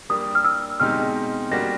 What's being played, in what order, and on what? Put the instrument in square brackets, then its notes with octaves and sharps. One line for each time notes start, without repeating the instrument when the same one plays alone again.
[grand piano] G3 A#3 D4 [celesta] D#6
[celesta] F6
E6
[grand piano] B2 G#3 C4 D#4 G4 [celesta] F6
[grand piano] G3 A#3 D4 F#4 [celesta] A#6